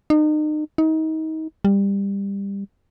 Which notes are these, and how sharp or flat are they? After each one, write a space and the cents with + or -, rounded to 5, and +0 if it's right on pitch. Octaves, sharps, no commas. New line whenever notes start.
D#4 -35
D#4 +30
G3 +20